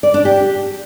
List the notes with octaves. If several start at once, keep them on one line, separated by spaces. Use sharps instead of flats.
D5
D4
G4